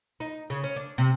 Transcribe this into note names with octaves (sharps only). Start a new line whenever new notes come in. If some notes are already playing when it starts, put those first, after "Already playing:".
D#4
C#3
C#4
D4
C3